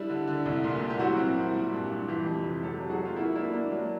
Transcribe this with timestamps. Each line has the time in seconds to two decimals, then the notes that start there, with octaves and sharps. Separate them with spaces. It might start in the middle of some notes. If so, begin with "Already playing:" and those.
Already playing: G3 D4 E4
0.09 D3
0.27 D3
0.46 C2
0.64 A#2
0.82 A#2
0.90 G4
0.99 F#3 E4 F#4
1.17 C4
1.36 A#2
1.54 G3
1.73 G2
1.90 G2
2.08 E3 F4 G4
2.26 F2
2.44 C3
2.63 F#3 G4 A4
2.80 F#3
2.89 F#4 G#4
2.98 F#3
3.05 F4
3.16 A#3 E4 F#4
3.35 A#3 D4 E4
3.53 A#3 D4
3.71 F#3 D4